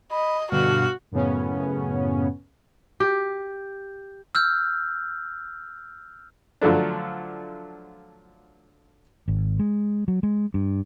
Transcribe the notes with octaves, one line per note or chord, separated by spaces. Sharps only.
D#5 B5
G2 B2 D3 F#4 F5
F#2 A2 C#3 B3 C#4
G4
E6 F6 G6
D3 F3 F#3 A3 D4
G#1
G#3
F#3
G#3
G2